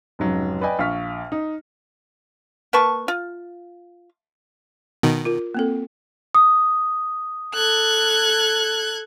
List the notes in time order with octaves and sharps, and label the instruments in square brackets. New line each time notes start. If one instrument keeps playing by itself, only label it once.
[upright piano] F1 G#2 C#3 F#3
B4 D5 D#5 G5 G#5
A#1 F5 C#6 F6 B6
D#4
[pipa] A#3 B4 A5 C#6
F4
[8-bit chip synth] B2 D#3
[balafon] F4 A#4
A#3 C4 A4
[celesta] D#6
[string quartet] A4 F#6 G#6